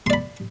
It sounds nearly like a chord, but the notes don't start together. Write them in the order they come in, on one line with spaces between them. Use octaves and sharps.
C6 D5 B5